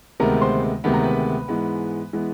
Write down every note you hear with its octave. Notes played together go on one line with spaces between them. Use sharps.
D2 C3 D#3 G#3 B3 A#4 A#5
C5 C6
D2 C3 D#3 G#3 B3 B5
A#5
B4 B5
G#2 E3 G#3 B3
E3 G#3 B3